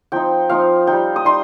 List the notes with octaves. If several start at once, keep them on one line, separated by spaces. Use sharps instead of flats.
F3 C4 D#4 G5
F3 C4 D#4 F5
G3 D#4 G5
D#6
G3 D#4 C6